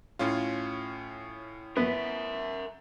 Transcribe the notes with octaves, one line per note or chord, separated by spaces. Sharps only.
A2 C#4 F4
B3 A#4 E5